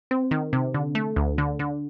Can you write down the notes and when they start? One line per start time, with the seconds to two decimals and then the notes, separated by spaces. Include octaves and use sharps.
0.11 C4
0.31 D#3
0.53 C3
0.74 D3
0.95 A3
1.16 D2
1.38 D3
1.59 D3